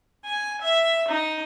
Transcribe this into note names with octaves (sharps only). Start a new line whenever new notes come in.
G#5
E5
D#4